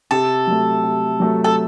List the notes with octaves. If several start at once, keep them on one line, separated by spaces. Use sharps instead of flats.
C3 A4
F#3 A3
C3
F#3 A3
A4